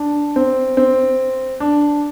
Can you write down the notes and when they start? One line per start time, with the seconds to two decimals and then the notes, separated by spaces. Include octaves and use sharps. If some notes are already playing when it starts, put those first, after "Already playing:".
Already playing: D4
0.36 C4
0.77 C4
1.60 D4